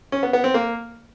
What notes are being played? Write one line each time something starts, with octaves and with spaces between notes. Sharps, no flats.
C#4
B3
B3
C4
A#3